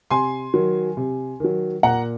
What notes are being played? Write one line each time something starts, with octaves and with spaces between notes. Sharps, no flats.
C3 G#5 C6
D#3 F#3
C3
D#3 F#3
A#2 F#5 A#5